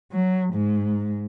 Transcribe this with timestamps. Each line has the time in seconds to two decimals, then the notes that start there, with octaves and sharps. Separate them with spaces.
0.12 F#3
0.54 G#2